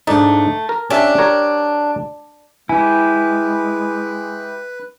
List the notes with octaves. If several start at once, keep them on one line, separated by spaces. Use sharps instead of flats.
G#2 A3 D4 D#4
A#4
C#4 D4 G4 E5
G4 A#4 C#5
G#3 E4 G4 B4 G#5